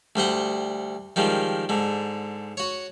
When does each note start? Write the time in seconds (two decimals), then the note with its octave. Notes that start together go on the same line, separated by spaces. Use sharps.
0.16 D2 G3 C5 F#5
1.16 D#3 F3 G3 G#3
1.69 G#2 D3
2.57 F#4 C#5